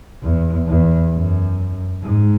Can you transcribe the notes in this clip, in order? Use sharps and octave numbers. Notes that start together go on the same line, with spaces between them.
E2
E2
F#2
G#2